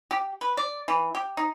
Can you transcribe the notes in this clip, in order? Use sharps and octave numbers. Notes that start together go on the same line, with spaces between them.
G4
B4
D5
E3
G4
D#4